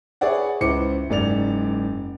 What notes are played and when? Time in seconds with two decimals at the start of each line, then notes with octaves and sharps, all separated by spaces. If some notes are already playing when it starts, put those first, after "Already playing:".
0.21 G#4 B4 C#5 D5 E5 F#5
0.61 C#2 E4 B4 C5 D6 C#7
1.10 F#1 G#2 D5 F7